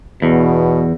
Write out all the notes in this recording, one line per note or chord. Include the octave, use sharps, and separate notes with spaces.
E2 B2